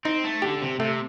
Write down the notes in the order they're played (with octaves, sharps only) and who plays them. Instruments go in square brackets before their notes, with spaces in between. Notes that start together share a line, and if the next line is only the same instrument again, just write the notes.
[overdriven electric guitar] C4 [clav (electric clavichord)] D#4
[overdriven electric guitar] A3
[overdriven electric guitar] D3 [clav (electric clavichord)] G4
[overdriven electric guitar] C3
[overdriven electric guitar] C3 [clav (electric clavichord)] A3